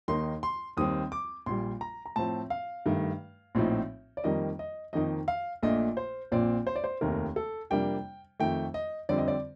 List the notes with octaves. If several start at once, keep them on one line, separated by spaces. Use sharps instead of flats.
D#2 D#3 A#3 D#4 C6
C6
D#2 D#3 G3 C4 D#6
D6
A#1 A#2 G3 C6
A#5
A#5
A2 F3 C4 A5
F5
G2 D#3 A3
A#1 A2 F3 C4 D#4
D5
F2 D#3 G3 A#3 D#5
D#5
F2 D#3 A#3 D#4 D#5
F5
A#1 A#2 A3 D4 D#5
C5
A#1 A#2 F3 C4 D5
C5
D5
C5
F1 D#2 D#3 A3 A#4
A4
F2 C3 G3 A#3 D4 G5
F2 D#3 A3 G5
D#5
F2 D3 G3 C4 D5
D#5
D5